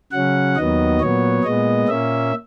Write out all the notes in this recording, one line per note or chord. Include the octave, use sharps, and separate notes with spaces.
C#3 F#3 C#4 F#5
D#2 D#3 F#3 B3 D#5
A#2 F#3 B3 C#5
A#2 G#3 B3 D#5
A#2 A#3 C#4 E5